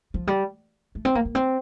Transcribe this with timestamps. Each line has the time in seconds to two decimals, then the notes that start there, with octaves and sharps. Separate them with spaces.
0.14 F3
0.27 G3
0.95 A3
1.05 C4
1.15 A#3
1.25 A#3
1.35 C4